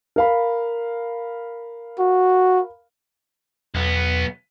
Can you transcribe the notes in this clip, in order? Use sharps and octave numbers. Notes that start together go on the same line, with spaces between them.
A#4 F5 B5
F#4
B1 E2 B3